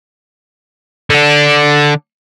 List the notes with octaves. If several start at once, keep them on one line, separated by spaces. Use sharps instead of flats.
D3 D4